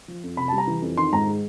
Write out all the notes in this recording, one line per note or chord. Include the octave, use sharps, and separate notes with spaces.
F3
F2
C3 B5
G3 A5
A#5
E3
F2
D#3 C6
G#2 A#5
G#3